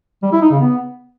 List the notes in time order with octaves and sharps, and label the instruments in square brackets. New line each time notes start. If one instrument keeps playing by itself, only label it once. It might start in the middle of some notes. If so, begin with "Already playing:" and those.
[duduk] G3
E4
D#4
C#3
B3